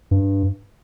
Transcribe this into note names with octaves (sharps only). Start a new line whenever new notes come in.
G2